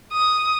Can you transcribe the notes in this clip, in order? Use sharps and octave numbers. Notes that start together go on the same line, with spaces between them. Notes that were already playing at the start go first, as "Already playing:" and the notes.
D#6